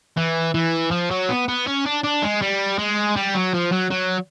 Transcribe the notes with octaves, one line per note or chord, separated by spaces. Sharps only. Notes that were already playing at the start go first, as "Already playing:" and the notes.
E3
E3
F3
F#3
B3
B3
C#4
D4
D4
G#3
G3
G#3
G3
F#3
F3
F#3
F#3